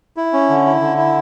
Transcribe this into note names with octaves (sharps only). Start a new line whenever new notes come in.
E4
C#4
D3
E4
D3
E4